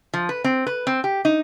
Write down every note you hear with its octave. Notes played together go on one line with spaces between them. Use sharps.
F3
B4
C4
B4
C4
G4
D#4